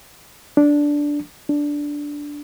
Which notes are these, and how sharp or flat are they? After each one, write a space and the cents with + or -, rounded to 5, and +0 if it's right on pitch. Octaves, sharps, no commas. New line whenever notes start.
D4 -5
D4 -5